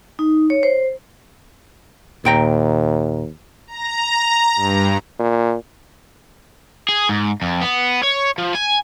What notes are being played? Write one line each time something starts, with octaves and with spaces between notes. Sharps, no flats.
D#4
C#5
C5
D#2 A#2 G5 A#5
A#5
G2
A#2
G#4
G#2
F2
B3
C#5
F3
G#5